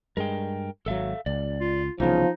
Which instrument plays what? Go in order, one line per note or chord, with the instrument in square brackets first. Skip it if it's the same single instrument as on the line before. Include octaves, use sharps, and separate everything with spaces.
[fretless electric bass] G2 G#3 [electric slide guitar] A#4 G5
[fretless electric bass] G#1 F#3 [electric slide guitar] A4 E5 F5
[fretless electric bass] C#2 [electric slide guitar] D5
[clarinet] F4
[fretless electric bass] C2 C#3 [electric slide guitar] E3 B3 [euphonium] F3 [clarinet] D#4